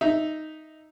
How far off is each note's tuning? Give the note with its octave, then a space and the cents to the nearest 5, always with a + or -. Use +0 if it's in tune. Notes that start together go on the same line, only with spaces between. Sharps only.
D#4 +0 E5 -5